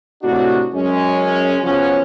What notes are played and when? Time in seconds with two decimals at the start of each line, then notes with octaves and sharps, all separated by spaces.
0.23 A2 C3 D4 D#4 F#4
0.73 F#2 G#3 C#4
1.63 C#3 F3 F#3 B3 C#4